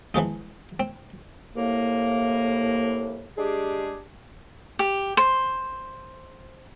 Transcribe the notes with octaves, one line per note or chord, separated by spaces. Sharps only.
E3 F3 G#3 D#4
C4
C2 A2 A#3
G#3 D4 G4 G#4
G4
C5